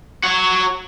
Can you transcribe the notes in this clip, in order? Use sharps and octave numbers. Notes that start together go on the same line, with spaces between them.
F#4 C#5